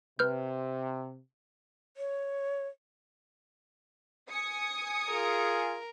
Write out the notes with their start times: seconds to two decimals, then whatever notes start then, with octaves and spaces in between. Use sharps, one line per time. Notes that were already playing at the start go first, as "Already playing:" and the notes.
0.19 C3 B4 F6 G6
1.97 C#5
4.30 G#5 D#6 C#7
5.09 F4 G#4 A#4